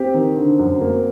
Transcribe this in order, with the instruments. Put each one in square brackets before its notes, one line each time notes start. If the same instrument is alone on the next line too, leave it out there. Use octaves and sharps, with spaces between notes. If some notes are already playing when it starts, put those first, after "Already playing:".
Already playing: [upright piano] C4 [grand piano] G4
[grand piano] D#3
D3
F#2
A#3